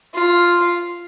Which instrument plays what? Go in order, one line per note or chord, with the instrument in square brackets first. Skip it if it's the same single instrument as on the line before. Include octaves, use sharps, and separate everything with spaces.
[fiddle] F4